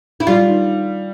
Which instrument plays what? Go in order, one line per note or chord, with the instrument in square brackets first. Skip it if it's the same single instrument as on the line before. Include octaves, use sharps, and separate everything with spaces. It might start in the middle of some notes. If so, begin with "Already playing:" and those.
[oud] E4
[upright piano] G3 [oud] F4
[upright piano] D#3